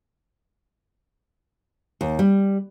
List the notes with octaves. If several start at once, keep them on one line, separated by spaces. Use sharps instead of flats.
D#2
G3